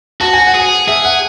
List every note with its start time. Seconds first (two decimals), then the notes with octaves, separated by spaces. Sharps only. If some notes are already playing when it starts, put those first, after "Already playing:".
0.21 F#4 A5
0.33 G#5
0.47 F#5
0.54 G#4
0.59 G#5
0.88 G#4 E5
1.05 F#5